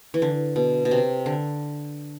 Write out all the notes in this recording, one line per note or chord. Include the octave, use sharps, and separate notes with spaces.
E3
D3
B2
B2
C3
D3